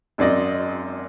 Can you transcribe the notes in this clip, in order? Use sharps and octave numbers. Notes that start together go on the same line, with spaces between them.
G#1 F#2 D5 D#5